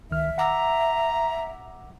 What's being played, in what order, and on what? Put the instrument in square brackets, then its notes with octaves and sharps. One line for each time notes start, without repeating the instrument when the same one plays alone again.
[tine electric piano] C#2 D#3 F6 [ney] E5
[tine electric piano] F#5 D6 E6 [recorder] A#5